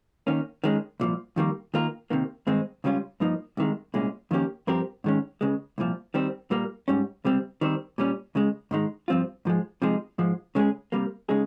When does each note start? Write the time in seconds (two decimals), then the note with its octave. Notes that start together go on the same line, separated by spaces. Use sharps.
0.27 D#3 A#3 C#4
0.64 D#3 G#3 C#4
1.00 C2 A#2 F3
1.36 F2 D#3 G3 A#3
1.74 D#3 A#3 F4 A#4
2.10 C3 D#3 A#3
2.47 G2 D#3 G#3 C4 D#4
2.84 C#2 C#3 G3 C#4 F4
3.20 G2 F3 A#3 D#4
3.57 C2 C3 D#3 G#3
3.94 C2 A#2 G#3 C#4
4.31 F2 D#3 A#3 C#4 G4
4.67 G2 F3 C4 G4 A#4
5.04 G#2 D#3 G#3 C#4
5.41 C#2 C#3 G#3
5.78 C2 A#2 F3
6.14 D#3 G3 C4
6.51 A#2 G3 A#3
6.88 G#2 G3 C#4
7.24 C#2 C3 G3 C4
7.61 D#3 G3 C4
7.98 A#2 G3 C#4
8.35 C#2 C#3 G#3
8.71 G#2 D#3 G#3 D#4
9.08 G2 F3 C4 F4
9.45 G#2 F3 G#3
9.82 C3 F3 G#3 D#4
10.18 G#2 F3 G#3
10.55 C#3 G#3 C#4 G#4
10.92 C3 G3 A#3
11.29 C#3 G#3 D#4 G#4